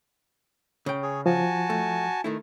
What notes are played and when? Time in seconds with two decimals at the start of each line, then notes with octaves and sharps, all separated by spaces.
0.86 C#3 G5
1.03 G#4 C#5
1.26 F3 F#4 G#5 A5
1.70 A3
2.24 D#3 A3 E4